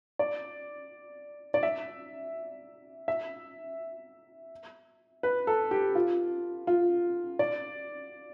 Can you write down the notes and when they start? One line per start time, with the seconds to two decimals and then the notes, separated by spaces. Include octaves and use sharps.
0.19 D5
1.54 D5
1.63 E5
3.08 E5
5.23 B4
5.47 A4
5.71 G4
5.95 F4
6.67 F4
7.39 D5